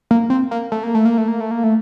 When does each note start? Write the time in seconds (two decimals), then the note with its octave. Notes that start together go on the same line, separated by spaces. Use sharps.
0.11 A#3
0.30 C4
0.51 A#3
0.72 A3
0.83 A#3
0.95 A3
1.05 A#3
1.18 A3
1.28 A#3
1.40 A3
1.51 A#3
1.64 A3